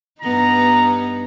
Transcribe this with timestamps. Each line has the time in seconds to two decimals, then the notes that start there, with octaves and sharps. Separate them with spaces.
0.22 G2 B3 D#4 A#5